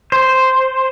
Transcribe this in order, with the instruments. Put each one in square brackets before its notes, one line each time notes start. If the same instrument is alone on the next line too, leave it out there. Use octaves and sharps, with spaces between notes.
[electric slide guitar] C5